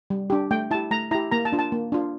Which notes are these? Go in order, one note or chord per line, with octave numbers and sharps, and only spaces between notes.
G3
D4 G4
A3 G5
E4 G4 A5
A3 A#5
E4 G4 A#5
A#3 A#5
A5
D4 F4
A5
A#3
D4 F4